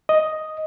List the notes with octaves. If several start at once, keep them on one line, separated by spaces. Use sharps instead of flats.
D#5